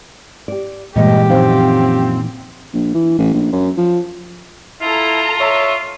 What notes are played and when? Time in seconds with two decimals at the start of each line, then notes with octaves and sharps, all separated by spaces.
0.48 G4 D5
0.96 G2 A#2 E3 G#3 G4 D#5
1.29 F#2 F3 C4 D#4 F5
2.74 A#1
2.95 E3
3.19 A1
3.34 A#1
3.53 F#2
3.77 F3
4.82 E4 F4 A4 A#5
5.40 C#5 E5